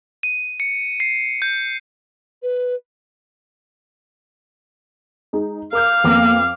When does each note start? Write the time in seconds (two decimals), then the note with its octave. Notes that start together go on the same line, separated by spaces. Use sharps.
0.23 D#7
0.60 C#7
1.00 C7
1.42 G6
2.42 B4
5.33 G#3 D#4
5.73 A#4 F5 D6 G6
6.04 F2 A#3 B3 D6